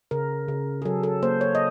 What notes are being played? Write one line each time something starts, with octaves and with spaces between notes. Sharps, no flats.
C#3 A#4
C#3
G#4
F#3 A4
A4
A#3 C5
C#5
D#5